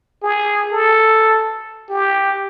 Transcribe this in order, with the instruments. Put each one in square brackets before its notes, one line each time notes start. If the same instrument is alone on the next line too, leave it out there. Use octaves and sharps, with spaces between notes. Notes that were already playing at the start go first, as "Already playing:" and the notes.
[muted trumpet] G#4
A4
G4